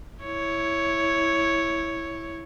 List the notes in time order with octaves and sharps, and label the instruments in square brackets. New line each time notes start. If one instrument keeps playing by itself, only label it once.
[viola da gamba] E4 C#5